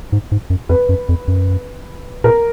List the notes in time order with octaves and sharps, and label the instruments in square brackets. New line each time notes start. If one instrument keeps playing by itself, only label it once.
[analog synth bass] G#2
G#2
F#2
[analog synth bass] F2 [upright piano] B4
[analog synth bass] F#2
F2
F#2
[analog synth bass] A#2 [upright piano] A#4